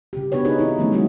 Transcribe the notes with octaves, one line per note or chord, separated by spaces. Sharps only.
C#3 C#4 G4
B3 D4 F#4 B4 C#5
C4 D#4 G#4 B4
D#4 E4
D#3 F3 A3 B3 C#4 D#4
G3 G#3 C4 C#4 D#4 F#4